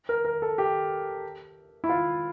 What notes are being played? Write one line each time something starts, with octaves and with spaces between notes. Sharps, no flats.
A#4
A#4
A4
G4
E4
F4